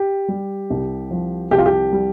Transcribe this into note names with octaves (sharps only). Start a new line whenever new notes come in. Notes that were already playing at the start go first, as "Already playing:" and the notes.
Already playing: G4
G3
C2
F3
C2 G4
F4
G4
G3